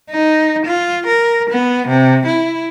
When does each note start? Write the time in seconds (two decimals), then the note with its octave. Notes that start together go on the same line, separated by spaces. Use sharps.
0.10 D#4
0.66 F4
1.07 A#4
1.50 B3
1.88 C3
2.26 E4